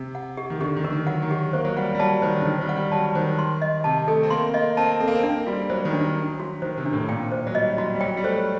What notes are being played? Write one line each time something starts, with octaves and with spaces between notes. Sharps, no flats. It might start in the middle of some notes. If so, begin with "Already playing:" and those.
Already playing: C3
F#5
G4
D#3
D3 G4
D#3
D3 A#4
D#3
F#3 F#5
D#3
G4
A#3 C5
F#3
G3 F#5
G3
F#3 A5
D#3 C5
D3
D#3 C5
G3
F#5
G3
F#3 A5
D#3 C5
C6
D#5
C3 A5
A3 A4
C4
A#3 C6
A#3 D#5
C4 A5
C4 A4
A#3
C4
A#3 D4
G3 F#4
F#3 C5
D#3
D4
F#3
D4
F#4
D#3 C5
C3
D4
A2
A#2 G5
C5
F#3
G3 D#5
F#3 F#4
G3
F#3 G5
G3
A3 C5